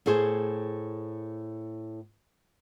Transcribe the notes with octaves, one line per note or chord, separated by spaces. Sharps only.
A2 A3 G#4 C5